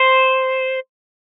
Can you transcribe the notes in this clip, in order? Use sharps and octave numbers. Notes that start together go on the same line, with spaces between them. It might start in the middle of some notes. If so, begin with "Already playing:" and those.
Already playing: C5